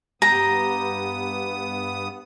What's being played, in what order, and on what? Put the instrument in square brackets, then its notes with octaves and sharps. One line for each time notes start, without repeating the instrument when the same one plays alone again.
[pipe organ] G2 B3 D#6 [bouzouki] G4 [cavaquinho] A#5